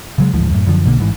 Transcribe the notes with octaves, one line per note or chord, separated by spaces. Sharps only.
C#3 F#3 G#3
A1 D2 G#2 F3
F#2 A2
F#2 D3 F3
B1 B2 D3 A#3
A1 G#2 E3